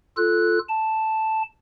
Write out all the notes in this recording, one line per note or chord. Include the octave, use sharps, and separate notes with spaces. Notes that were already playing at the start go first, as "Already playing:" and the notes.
F4 A4 F#6
A5